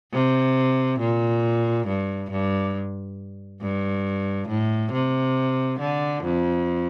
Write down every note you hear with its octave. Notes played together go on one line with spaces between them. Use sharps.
C3
A#2
G2
G2
G2
A2
C3
D3
F2